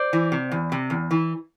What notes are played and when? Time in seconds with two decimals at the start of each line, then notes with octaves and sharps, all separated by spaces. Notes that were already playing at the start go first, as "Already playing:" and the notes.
Already playing: C5 D5
0.13 E3
0.32 C3
0.52 E2
0.72 C3
0.90 E2
1.11 E3